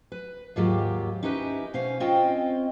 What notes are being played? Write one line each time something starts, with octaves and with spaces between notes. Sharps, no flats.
B4
D#2 G#2 F#3 F4 G4
C#4 D#4 E4 G4 B4
B2 C#4 C5 F5
C4 C#4 F4 D#5 G5